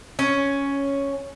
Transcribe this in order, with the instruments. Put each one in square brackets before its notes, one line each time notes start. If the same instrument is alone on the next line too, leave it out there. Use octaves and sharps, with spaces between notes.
[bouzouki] C#4